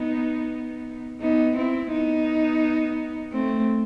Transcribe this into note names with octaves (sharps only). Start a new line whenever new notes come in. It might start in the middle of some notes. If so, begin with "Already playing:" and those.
Already playing: B3 D#4
B3 D#4
C4 E4
B3 D#4
A3 C4